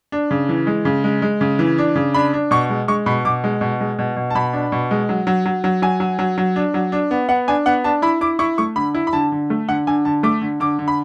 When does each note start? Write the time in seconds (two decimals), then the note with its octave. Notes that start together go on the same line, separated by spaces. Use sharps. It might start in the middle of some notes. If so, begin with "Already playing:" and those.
0.12 D4
0.31 C#3
0.49 E3
0.67 G#3
0.85 C#3
1.04 G#3
1.22 G#3
1.41 C#3
1.59 E3
1.78 D4
1.95 C#3
2.14 D4 B5
2.33 D4
2.51 B2 C#6
2.70 G#3
2.88 G#3 C#6
3.06 B2 B5
3.25 B2 D6
3.44 G#3
3.61 B2
3.81 G#3
3.99 B2
4.16 B2
4.30 A5
4.35 B2 B5
4.53 D4
4.72 B2
4.91 G#3
5.09 F#3
5.27 F#3
5.46 F#3
5.64 F#3
5.82 F#3 G#5
6.00 F#3
6.19 F#3
6.38 F#3
6.56 D4
6.74 F#3
6.92 D4
7.11 B3
7.29 B3 F#5
7.48 D4 G#5
7.66 B3 F#5
7.84 D4 A5
8.02 E4 B5
8.21 E4 D6
8.39 E4 C#6
8.58 A3 C#6
8.76 D3 B5
8.94 E4
9.07 B5
9.13 D3 A5
9.32 D3
9.50 A3
9.69 D3 F#5
9.87 D3 G#5
10.05 D3 A5
10.23 A3 D6
10.41 D3
10.60 D3 D6
10.79 D3
10.88 B5